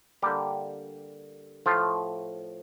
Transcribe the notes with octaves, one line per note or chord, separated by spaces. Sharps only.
D3 G3 A#3 G4
A2 F3 A3 F4